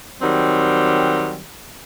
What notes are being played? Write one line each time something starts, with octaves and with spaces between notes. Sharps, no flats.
D#3 F#3 G3 C4